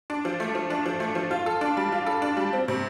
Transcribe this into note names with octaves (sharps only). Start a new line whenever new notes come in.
D4
F3
A3
F3
D4
F3
A3
F3
F4
A4
D4
G3
F4
A4
D4
G3
C4
C3